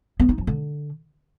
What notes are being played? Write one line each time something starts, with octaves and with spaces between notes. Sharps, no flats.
B3
D#4
F3
D3